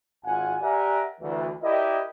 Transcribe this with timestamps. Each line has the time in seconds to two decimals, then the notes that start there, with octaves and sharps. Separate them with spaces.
0.24 G#1 F4 F#5 G#5
0.61 G4 A#4 D5 E5 F#5 G#5
1.21 D2 E3
1.63 E4 G4 A#4 D5 D#5